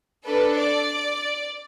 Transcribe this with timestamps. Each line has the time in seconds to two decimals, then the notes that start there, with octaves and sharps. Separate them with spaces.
0.26 D4 A4 B4
0.58 D5